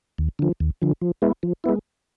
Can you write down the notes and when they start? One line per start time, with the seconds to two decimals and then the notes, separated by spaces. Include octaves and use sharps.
0.18 D#2
0.39 D3 F3
0.60 D#2
0.82 D3 F3
1.01 F3
1.22 G#3 B3 E4
1.43 F3
1.64 G#3 B3 E4